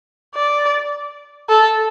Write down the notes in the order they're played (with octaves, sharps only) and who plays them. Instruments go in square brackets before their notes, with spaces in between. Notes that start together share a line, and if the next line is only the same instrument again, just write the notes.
[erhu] D5
A4